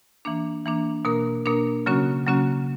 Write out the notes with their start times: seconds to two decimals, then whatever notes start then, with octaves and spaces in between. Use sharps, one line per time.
0.25 E3 A#3 D4
0.65 E3 A#3 D4
1.05 B2 A#3 D4 A#4
1.46 B2 A#3 D4 A#4
1.86 C#3 F#3 A#3 C#4 F#4
2.26 C#3 F#3 A#3 C#4 F#4